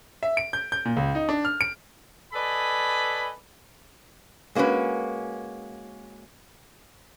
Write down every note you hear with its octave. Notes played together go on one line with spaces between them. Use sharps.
E5
D7
G6
G6
A#2
C#2
D#4
D4
F6
D7
A4 B4 D5 D#5 G#5 B5
G#3 A#3 C#4 F#4 B4